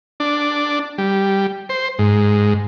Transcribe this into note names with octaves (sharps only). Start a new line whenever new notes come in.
D4
G3
C5
G#2